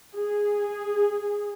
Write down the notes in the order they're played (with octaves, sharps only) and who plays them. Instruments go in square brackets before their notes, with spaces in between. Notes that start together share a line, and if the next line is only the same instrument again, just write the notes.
[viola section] G#4